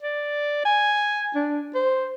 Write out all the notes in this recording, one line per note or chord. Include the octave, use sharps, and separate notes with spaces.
D5
G#5
D4
C5